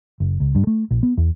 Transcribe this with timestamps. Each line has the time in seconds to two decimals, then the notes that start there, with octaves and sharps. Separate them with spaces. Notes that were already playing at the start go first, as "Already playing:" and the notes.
0.20 F#1
0.40 C#2
0.55 G2
0.67 A3
0.91 A#1
1.03 B3
1.18 E2